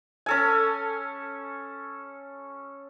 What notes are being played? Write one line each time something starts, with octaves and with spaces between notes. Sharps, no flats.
C#4 A4 G#5